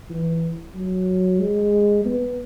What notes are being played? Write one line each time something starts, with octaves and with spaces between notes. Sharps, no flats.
E3
F#3
G#3
B3